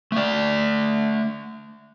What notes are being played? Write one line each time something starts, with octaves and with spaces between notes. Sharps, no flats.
A3 D5